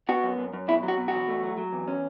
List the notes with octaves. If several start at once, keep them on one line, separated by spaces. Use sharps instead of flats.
B3 F#4
F#2
F#2
F#2
B2 E4
F#3
F#4
B2
E2 F#4
A3
F#3
F#3
E2
C#4